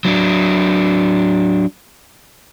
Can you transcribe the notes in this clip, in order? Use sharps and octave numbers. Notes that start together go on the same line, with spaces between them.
F#3 D4